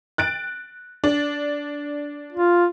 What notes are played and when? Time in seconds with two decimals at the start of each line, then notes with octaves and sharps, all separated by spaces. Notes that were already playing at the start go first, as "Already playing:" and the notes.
0.18 F#6 A6 D7
1.04 D4
2.32 F4